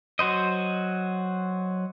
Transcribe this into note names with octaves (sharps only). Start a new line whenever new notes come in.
F#3 F#4 C5 D#5